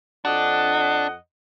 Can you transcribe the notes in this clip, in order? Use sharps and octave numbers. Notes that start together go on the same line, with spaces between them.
F2 D4 D#5 F#5